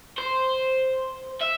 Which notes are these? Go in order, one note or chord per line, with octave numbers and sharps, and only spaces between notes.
C5
E5